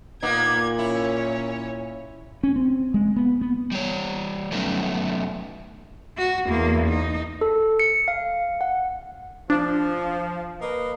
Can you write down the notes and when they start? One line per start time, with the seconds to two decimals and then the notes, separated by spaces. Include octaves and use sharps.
0.22 A#2 A#3 B3 D#4 G#6
0.79 C#4 E4 C#5
2.43 C#4
2.56 C4
2.94 G#3
3.16 B3
3.41 B3
3.72 G3 C#5
4.52 F#3 A3 B3 C#4 D#4
6.17 F#4
6.47 E2 A#3
6.89 D#4
7.41 A4
7.79 C#7
8.08 F5
8.61 F#5
9.50 F3 D4
10.61 A#3 B4 D#5